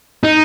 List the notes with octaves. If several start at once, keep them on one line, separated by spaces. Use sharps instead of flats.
D#4